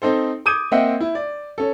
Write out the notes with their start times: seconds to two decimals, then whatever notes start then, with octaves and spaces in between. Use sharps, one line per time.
0.02 C4 D#4 A4 C5
0.46 D6 D#6 G6 G#6 D#7
0.71 A#3 C4 D#5 E5 F#5 G5
1.00 E4
1.15 D5
1.58 C#4 A4